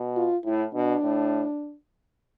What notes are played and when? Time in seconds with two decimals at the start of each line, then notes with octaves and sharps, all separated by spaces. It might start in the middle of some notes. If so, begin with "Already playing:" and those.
Already playing: B2
0.17 F4
0.45 A2 E4
0.74 B2 D4
1.04 A2